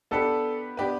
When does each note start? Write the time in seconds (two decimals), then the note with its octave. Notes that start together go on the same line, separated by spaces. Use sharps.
0.11 B3 D4 G4 A4 B4
0.77 B3 D4 G4 B4